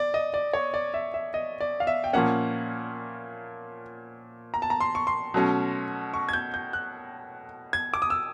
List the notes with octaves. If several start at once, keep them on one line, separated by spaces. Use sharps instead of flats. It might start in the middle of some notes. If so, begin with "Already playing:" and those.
Already playing: D5
D#5
D5
C#5
D5
E5
E5
D#5
D5
F5
E5
G5
A#2 F3 A#3 C#4 F#5
A#5
A5
A#5
C6
C#6
C6
B2 F#3 A3 C#4
C#6
G#6
G6
G6
F#6
G#6
D6
D#6
E6